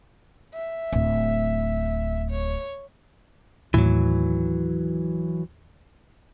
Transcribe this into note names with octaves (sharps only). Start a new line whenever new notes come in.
E5
D1
C#5
D#2 A2 D#3 E3 F#3